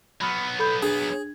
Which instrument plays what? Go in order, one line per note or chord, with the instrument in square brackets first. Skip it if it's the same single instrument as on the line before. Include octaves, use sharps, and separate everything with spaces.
[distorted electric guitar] F#3 B3 [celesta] B5 F6 C#7
[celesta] A4 B5 G6
[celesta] D4 G#6 [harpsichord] G#4